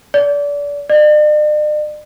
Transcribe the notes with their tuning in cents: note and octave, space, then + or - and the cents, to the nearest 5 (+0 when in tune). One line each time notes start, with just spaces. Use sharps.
D5 -30
D5 +45